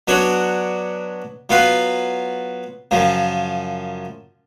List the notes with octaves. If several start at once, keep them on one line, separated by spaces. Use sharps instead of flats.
F#3 B3 D4 F#4 C#5
F#3 B3 F4 B4 F5
F#2 C#3 F3